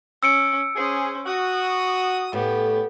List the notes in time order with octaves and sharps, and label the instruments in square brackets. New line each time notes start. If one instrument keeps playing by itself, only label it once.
[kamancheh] C#4 [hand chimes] E6 C#7 D7
[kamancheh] C#4 C5 [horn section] G#4
[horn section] F#4 [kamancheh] D#6
[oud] A2 [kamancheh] B3 G4